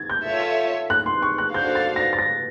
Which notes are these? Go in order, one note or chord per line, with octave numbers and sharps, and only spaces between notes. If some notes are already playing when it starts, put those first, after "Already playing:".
Already playing: G#6 A6
G6
F4 A4 C#5 E5
F#6
C6
C#6
F#6
D4 F#4 A4 C5 F5 G6
A6
A#6
A6
A#6